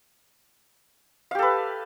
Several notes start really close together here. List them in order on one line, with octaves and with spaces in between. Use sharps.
F5 G4 A4 B4